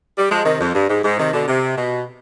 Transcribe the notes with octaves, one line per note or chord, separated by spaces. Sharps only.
G3
F3 G#3
C3 D#3
F2
G2
G#2
G#2
C3 D#3
B2 D3
C3
B2